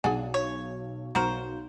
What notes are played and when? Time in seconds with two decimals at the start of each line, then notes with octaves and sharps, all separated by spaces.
0.04 B1 D4 G#4 F#5 G#5
0.34 C#5
1.15 B1 F#4 A#4 C5